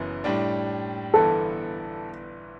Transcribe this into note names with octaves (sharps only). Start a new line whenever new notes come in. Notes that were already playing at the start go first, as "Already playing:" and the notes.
Already playing: F#1 F#2 E3 B3
A2 G3 D4
G1 G2 E3 B3 A4